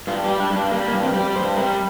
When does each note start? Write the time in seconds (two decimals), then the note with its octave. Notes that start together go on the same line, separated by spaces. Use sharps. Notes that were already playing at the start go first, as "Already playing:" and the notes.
0.07 G2 F4
0.24 G4
0.28 G3
0.40 D4
0.50 G2
0.56 D4
0.71 G3 A#3
0.88 A#3
0.92 G2
1.03 C4
1.14 G3
1.20 D5
1.36 G2 C5
1.57 G3 A#4